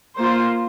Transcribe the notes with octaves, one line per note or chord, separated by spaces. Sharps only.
A#3 F4 C5